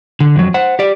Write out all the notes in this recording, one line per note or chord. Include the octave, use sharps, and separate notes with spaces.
D3
F2 F#3
C5 F#5
G4 D5